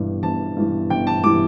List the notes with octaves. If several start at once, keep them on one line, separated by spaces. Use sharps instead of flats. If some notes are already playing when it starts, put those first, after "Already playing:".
Already playing: G1 G2 E3 G3
G1 A5
G2 E3 G3
G1 G5
A5
E3 G3 D6